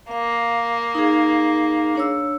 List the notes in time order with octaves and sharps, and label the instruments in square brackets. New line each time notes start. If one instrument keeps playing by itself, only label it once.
[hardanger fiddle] A#3 [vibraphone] F5
[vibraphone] D#4 G#4
D4 C#5 E6